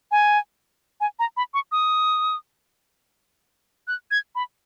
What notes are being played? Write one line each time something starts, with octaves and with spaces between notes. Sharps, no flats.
G#5
G#5
A#5
B5
C#6
D#6
F#6
G#6
B5